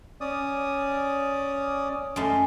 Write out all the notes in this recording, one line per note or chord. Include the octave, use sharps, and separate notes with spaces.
C#4 D5 D#6
F#2 A3 D#5 C6